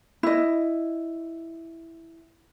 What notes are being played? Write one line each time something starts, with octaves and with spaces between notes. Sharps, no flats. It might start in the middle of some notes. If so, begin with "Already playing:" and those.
E4 D#5